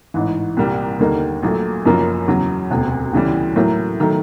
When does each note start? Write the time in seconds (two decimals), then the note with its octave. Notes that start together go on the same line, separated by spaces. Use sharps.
0.14 A1 G#2 E3
0.57 C2 A#2 G3 A#3
0.99 D#2 D3 G3 A#3 D#4
1.43 A#1 A#2 F#3 A3
1.85 F#1 F#2 C#3 F3 A#3
2.28 E2 C#3 F#3
2.71 E1 D2 C3
3.13 D2 C#3 E3 G3
3.56 A2 F#3 A#3
4.00 D#3 F#3 A3